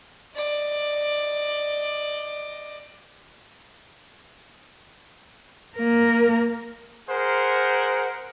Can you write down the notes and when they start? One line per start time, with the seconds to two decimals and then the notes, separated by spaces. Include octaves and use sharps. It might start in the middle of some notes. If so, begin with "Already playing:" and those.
0.36 D5 D#5
5.77 A#3 A#4
7.10 G#4 A#4 C5 F#5